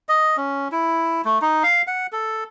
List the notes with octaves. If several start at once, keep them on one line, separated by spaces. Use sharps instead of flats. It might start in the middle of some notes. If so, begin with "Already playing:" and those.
D#5
C#4
E4
A3
D#4
F5
F#5
A4